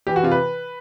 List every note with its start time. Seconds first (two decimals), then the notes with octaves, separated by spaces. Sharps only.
0.07 E3 G4
0.16 F#4
0.23 C3 F4
0.31 B4